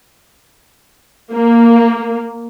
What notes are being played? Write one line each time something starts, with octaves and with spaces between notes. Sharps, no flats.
A#3